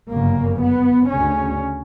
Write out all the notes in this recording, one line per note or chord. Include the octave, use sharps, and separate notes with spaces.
G1 F#2 C#3 A#3
B3
D2 C#3 C#4